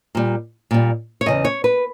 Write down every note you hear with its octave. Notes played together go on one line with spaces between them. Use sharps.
A#2 G3
A#2 G3
C#5
E2 C#3 E3 D#5
C#5
B4